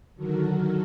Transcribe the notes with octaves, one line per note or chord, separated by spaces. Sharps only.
D3 D#3 F#3 F#4 A4 A#4